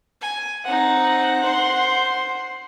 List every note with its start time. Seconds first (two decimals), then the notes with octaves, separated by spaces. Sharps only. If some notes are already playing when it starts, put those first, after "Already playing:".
0.21 G#5
0.65 C4 D#4 F#5
1.43 C5 C6